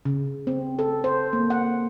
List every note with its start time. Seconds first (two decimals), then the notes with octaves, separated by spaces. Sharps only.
0.05 C#3
0.47 C4
0.79 A4
1.04 C5
1.33 A#3
1.50 F#5